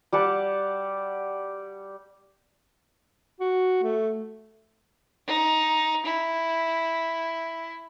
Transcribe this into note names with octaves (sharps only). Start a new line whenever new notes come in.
G3 G4 F#5 A5
F#4
A3
D#4
E4